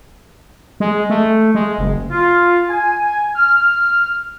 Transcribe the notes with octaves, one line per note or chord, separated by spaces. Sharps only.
G#3
A3
G#3
F#1
F4
G#5
F6